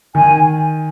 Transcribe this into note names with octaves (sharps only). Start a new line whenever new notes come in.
D#3 G#5